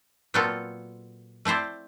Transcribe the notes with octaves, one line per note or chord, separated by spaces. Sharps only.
A#2 F#3 B3 C4 F4 A4
A3 C4 E4 C5 D5